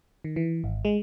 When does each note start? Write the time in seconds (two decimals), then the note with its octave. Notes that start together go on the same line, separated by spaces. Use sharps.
0.24 D#3
0.36 E3
0.64 G#1
0.85 G#3